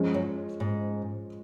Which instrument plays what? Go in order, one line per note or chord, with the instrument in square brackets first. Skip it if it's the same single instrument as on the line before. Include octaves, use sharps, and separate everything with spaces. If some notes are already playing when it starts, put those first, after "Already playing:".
Already playing: [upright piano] F3 G#3 C#4
[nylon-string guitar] F#2
G#2